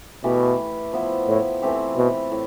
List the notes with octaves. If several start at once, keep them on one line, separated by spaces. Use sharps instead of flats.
B2 E3 A3 E4 G4
F3 B3 E4
A2
E3 A3 C4 G4
B2
A2